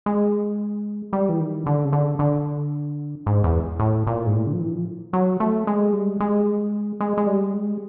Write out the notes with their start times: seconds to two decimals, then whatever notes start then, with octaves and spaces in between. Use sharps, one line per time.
0.06 G#3
1.13 G3
1.29 E3
1.40 D#3
1.66 D3
1.85 C#3
1.93 D3
2.19 D3
3.26 G#2
3.44 E2
3.80 A2
4.07 A#2
4.27 G#2
4.34 A2
4.46 D3
4.53 F3
4.60 E3
4.73 F3
5.13 F#3
5.40 A3
5.67 G#3
5.93 G3
6.20 G#3
7.01 G#3
7.17 G#3
7.27 G3
7.54 G#3